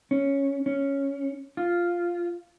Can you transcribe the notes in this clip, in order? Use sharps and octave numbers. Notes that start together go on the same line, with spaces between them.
C#4
C#4
F4